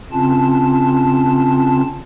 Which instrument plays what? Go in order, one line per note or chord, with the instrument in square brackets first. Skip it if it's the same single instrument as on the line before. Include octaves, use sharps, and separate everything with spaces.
[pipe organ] C#3 C4 C#4 F4 A5